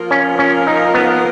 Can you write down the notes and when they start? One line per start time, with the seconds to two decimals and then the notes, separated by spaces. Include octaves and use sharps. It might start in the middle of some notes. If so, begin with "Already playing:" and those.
Already playing: F3 A#3 F4 A#4
0.11 C#4
0.39 C#4
0.67 D#4
0.94 B3